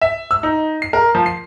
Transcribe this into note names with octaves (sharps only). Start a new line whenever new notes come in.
E5
E6
D#4
C7
A#4
F3
C7